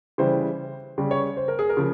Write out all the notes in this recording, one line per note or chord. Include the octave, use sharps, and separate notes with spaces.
C#3 E3 G3 C5
C#3 G3
C#5
C5
A#4
G#4
A#4
C#3 F3